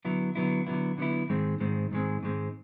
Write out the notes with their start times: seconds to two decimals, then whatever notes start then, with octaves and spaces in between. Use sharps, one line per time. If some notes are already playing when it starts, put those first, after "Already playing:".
0.05 D3 F#3 B3 E4
0.35 D3 F#3 B3 E4
0.67 D3 F#3 B3 E4
0.98 D3 F#3 B3 E4
1.29 G#2 D#3 G#3 C4
1.60 G#2 D#3 G#3 C4
1.91 G#2 D#3 G#3 C4
2.23 G#2 D#3 G#3 C4